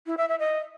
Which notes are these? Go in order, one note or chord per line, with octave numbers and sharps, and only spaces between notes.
E4
E5
E5
D#5